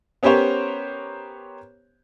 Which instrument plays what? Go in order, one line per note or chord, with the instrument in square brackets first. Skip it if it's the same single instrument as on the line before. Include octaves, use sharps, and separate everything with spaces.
[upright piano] B3 C#4 G4 A#4 C5 C#5